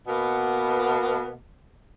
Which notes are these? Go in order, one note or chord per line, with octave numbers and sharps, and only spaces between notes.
B2 A#3 B3